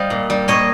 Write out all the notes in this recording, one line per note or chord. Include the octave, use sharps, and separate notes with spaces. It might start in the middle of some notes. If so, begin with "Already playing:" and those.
Already playing: G3 C5 D#5 F5
A#2
G3
A#2 C#5 D#5